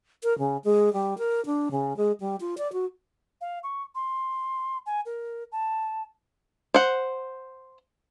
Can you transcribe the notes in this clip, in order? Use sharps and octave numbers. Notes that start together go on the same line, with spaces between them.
A#4
C#3
G#3
G3
A#4
D4
C#3
G#3
G3
F4
D5
F#4
F5
C#6
C6
G#5
A#4
A5
C5 F#5